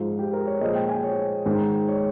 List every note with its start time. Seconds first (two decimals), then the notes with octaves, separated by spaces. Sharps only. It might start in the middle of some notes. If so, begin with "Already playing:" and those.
Already playing: G#2 F3 G#3 F4
0.19 G4
0.33 A#4
0.47 C#5
0.61 A#2 F3 G#3 D#5
0.75 G5
0.89 G#5
1.03 C#5
1.45 G#2 D#3 G#3
1.88 C#5